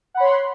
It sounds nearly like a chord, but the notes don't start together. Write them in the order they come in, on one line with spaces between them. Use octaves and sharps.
F#5 B5 C#5 C6